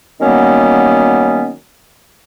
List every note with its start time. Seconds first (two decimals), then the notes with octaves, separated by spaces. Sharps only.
0.21 D#3 F#3 G3 A#3 B3 C#4